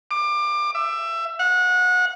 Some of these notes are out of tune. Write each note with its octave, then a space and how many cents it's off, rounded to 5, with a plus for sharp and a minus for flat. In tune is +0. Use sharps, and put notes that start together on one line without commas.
D6 +25
E5 +20
F#5 -25